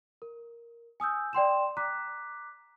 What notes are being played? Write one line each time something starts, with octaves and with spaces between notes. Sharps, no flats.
A#4
G#5 D#6 E6 G6
D5 G5 C6 E7
A#5 D6 F#6 B6